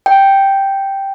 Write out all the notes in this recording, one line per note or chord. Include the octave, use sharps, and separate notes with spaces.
G5